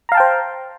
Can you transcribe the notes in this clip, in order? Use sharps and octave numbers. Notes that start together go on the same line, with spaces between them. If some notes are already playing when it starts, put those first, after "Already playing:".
C5 F5 G5 A5 A#5